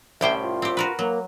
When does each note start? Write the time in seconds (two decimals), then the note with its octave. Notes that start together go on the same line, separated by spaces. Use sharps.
0.21 C2 A2 C#4 G4 C5 E5 G5
0.42 F4
0.62 C4 G4
0.77 F#4 A#4 B4
0.99 F#3 A#3